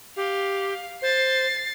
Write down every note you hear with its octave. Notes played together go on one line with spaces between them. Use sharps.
G4 F5
C5 A6 C7